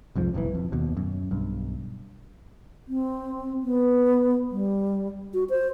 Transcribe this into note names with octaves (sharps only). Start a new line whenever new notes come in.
C2 F2 G#2 F3
F#1 B1 C3 E3
F2
D#2 B2
F#2
B1 G2
C4
B3
G3
F#4
C5